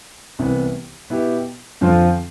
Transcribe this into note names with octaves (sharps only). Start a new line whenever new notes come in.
C2 C3 E3 B3
B2 B3 E4 G4
F2 D3 F3 C4 F4